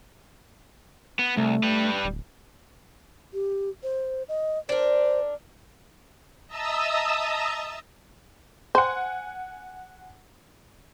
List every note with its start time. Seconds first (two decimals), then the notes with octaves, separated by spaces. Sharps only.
1.19 B3
1.37 C2 A3
1.63 G3 B4
2.04 D1
3.33 G4
3.83 C5
4.29 D#5
4.69 D4 A#4 C5
6.47 D#5 E5 A5 A#5 D#6 E6
8.75 C5 F#5 G#5